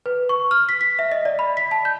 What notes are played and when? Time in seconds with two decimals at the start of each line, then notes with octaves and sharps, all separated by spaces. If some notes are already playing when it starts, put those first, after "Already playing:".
0.06 B4
0.29 C#6
0.51 F6
0.69 B6
0.81 B6
0.99 E5
1.12 D#5
1.25 D5
1.39 B5
1.57 B6
1.71 A5
1.85 G6